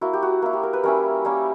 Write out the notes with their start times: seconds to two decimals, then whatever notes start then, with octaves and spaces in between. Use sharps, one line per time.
0.01 A#3 E4 F#4
0.13 G4
0.22 F#4
0.42 A#3 E4
0.53 G4
0.63 A#4
0.73 B4
0.83 G3 C#4 E4 A#4
1.25 G3 A#3 C#4